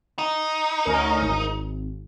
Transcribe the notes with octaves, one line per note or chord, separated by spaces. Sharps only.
D#4
D2 C#4 A#4
G#1